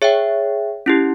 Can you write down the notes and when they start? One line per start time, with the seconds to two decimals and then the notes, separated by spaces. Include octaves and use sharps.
0.02 G#4 C#5 E5 G5
0.86 C#4 E4 G4